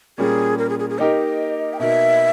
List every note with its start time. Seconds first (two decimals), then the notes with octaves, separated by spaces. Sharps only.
0.18 A#2 G3 A#3 C#4 G#4
0.58 A#4
0.69 G#4
0.79 G#4
0.90 G#4
0.99 A#3 D#4 G4 A#4 D#5
1.73 G5
1.79 B2 A#3 D#4 A#4 E5